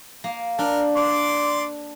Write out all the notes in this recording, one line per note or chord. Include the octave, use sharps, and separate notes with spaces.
A#3
D4 A#4
D5 C6 D6